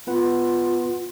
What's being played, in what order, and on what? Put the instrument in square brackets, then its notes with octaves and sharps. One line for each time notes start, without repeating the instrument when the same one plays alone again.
[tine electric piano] B3 B4 F#5 [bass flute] F4